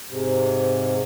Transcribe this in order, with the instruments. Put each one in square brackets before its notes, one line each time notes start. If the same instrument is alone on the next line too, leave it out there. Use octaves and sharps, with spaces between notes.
[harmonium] G#2 C3